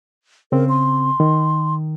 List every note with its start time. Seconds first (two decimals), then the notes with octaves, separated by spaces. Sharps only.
0.52 C#3 C4 A#4
0.69 C6
1.20 D#3